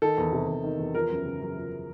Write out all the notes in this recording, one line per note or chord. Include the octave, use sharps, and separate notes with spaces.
D#3 A4
E2
C3
E2
D#3
E2
F3 A#4
F#2
C#3
F#2
F3